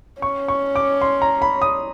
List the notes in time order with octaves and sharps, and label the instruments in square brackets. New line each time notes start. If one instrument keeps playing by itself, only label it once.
[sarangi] C#4 [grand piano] C#6
[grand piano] C#6
D6
C6
A#5
B5
D#6